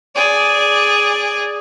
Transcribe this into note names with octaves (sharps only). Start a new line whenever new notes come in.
G#4 D5